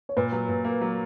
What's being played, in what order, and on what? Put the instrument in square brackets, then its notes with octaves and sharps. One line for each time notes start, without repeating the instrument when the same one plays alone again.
[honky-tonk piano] C#5
[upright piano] A#2 [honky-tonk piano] B4
[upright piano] F#3
A#2
A#3
F#3